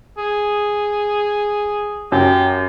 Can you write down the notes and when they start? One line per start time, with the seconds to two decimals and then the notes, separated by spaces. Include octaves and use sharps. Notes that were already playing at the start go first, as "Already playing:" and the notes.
0.18 G#4
2.12 F#2 G4